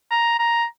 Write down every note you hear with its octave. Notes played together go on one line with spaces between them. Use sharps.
A#5
A#5